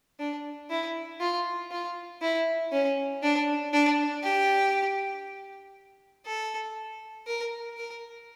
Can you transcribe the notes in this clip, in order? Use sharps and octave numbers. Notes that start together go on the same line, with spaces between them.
D4
E4
F4
F4
E4
C#4
D4
D4
G4
A4
A#4
A#4